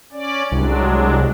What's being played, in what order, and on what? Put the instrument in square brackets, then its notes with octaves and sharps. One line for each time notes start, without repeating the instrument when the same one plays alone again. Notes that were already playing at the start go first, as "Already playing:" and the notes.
[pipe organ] C#4 D5
[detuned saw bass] C2 [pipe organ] F#3 G#3 D4